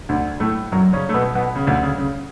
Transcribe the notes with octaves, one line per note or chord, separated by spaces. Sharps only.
D2 D3
A2 A3
F#2 F#3
C#3 C#4
A3
B2 B3
B2 B3
C#3
D2 D3
C#3
C#3